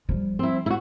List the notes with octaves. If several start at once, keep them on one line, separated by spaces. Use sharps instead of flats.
F3 G3
C4 E4
E4 F#4